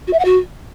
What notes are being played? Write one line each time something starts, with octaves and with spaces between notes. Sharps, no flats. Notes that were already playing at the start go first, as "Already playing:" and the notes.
F#4
E5
F#5
F#4